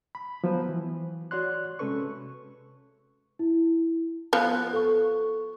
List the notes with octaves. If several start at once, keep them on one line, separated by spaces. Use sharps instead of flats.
B5
F3 F#3 B3 B4 C5
E3
F#4 C#5 D5 C6 F#6
C3 G#3 C#4 A4 B4 C#6
E4
F3 B3 F#6
A4 C#6